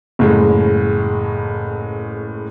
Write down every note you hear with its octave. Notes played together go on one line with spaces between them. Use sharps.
F#1 A2 G#3